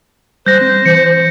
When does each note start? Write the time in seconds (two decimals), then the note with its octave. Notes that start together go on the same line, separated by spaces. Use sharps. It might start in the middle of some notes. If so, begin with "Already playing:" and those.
0.46 G3 C5 F#6 G6 A#6
0.61 C4
0.86 E3 C#7